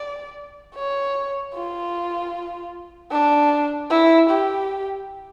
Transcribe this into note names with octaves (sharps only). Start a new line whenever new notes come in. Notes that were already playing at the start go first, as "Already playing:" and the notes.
Already playing: D5
C#5
F4
D4
E4
G4